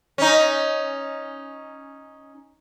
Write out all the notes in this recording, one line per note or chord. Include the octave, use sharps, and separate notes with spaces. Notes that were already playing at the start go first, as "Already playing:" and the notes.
C#4 D#4